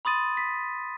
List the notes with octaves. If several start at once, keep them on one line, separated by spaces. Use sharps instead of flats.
B5 C6 D#6 A6 D#7
B6